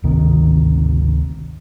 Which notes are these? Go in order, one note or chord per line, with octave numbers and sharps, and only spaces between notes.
G#1 D2 C3 D#3